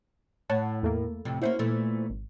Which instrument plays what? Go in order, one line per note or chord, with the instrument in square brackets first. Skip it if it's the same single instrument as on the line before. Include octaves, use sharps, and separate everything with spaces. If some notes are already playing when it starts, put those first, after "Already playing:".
[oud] A2 [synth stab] C#5 F#5 A5
[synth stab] E2 A3 A#3
[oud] F2 A2 C3
[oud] A#3 C#4 F#4 [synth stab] E4 C5
[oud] A#2 E3 A3
[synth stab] G#1